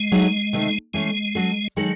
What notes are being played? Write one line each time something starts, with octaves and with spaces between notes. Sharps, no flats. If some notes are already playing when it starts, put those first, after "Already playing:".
Already playing: G#3
F#3 A3 D#4 G#4
C3 D#3 A3
E3 G#3 A3 C#4
F#3 C#4 F#4 A4
D#3 F#3 G#3 D#4 A4